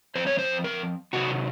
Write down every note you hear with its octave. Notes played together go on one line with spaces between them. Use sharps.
F3 C4 C5
C#5
C5
A#4
C3 D#3 F#3 F#4